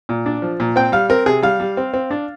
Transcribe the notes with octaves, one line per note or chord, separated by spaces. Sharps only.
A#2
D4
F3
A#2
C4 G5
G3 F5
C4 A#4
C3 G#4
G3 F5
G3
C4
C4
D4